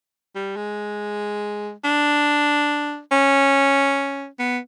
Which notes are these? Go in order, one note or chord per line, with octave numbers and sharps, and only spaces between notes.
G3
G#3
D4
C#4
B3